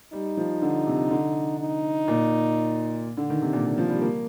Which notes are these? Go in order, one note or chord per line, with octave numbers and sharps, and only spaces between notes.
G3 D#4
F3
D3
C3
D3
D#4
A#2
D3
D#3
C3
A#2
A#2
F3
G3
A#3